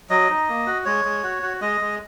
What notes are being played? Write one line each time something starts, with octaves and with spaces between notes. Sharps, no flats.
F#3 D#5
D#4
A#3
F#4
G#3 C#5
G#3
F#4
F#4
G#3 D#5
G#3